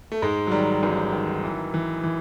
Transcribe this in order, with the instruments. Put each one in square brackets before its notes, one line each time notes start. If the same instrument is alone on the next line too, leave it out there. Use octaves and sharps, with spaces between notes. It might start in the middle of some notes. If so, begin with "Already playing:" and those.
[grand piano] A3
G#2 G#3
F#3
D#3 G3
A1 F#3
D#3
E3
E3
E3